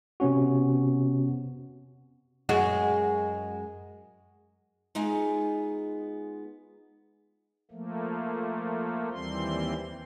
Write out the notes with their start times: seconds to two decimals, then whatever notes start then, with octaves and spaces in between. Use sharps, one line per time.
0.20 C3 B3 C#4 F#4
2.49 F#2 G#3 F#4
4.95 G#3 B3 D#4 F4 G#4
7.71 F3 A3 A#3
9.12 D#2 E3 G3 C4 C6